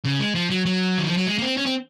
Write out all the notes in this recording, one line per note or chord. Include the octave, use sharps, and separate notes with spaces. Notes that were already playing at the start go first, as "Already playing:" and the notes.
C#3
G#3
F3
F#3
F#3
D#3
F3
F#3
G#3
A#3
C4
C#4
C4